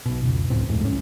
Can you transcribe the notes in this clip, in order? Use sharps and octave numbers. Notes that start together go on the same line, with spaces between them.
B1 B2
F1 C#2
D1 C#2 A2 C4
D1 F2 G#2 A3
G1 A2 C#4